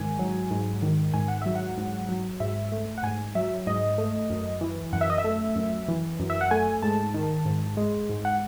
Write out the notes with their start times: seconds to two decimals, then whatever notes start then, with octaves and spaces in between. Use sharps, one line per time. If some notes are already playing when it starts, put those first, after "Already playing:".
Already playing: G#2 D#3 G#5
0.19 F#3
0.51 G#2
0.82 D#3
1.14 G#2 G#5
1.28 F#5
1.42 F#3 E5
1.55 F#5
1.77 G#2
2.09 F#3
2.40 G#2 E5
2.72 A3
2.98 F#5
3.03 G#2 G#5
3.35 F#3 E5
3.67 G#2 D#5
3.98 A3
4.30 F#2
4.61 E3
4.93 F#2 F#5
5.01 E5
5.10 D#5
5.18 E5
5.24 A3
5.56 F#2
5.88 E3
6.20 F#2
6.30 E5
6.41 F#5
6.51 A3 G#5
6.82 G#2 A5
7.14 D#3
7.45 G#2
7.77 G#3
8.09 G#2
8.25 F#5